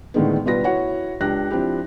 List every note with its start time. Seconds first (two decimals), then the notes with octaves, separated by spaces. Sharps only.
0.14 A2 D3 D#3 G#3 B3
0.46 B2 G3 F4 B4 A#6
0.64 E4 F#4 C#5 F#5
1.21 C#2 D4 G4 F#6 A#6
1.51 F3 C4 D4 E4 G4